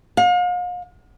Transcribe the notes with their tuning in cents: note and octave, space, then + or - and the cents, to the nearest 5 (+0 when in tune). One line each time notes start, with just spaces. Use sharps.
F5 +40